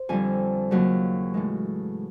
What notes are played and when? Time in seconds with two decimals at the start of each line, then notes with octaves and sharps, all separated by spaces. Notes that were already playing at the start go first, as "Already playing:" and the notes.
Already playing: C5
0.09 F2 D3 G3 G#5
0.71 D#2 C#3 F#3
1.34 A2 E3 G#3